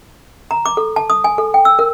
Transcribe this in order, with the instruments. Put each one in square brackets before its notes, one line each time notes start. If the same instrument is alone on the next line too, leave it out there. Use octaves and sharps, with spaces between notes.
[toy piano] A#5
D6
A4
A5
D#6
G#5
A4
G5
E6
A#4